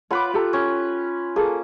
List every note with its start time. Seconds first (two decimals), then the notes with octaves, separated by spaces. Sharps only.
0.11 F4 B4 C#5 F#5 B5 D6
0.34 G4 A4 A#5
0.53 C#4
1.36 A#3 G#4 A4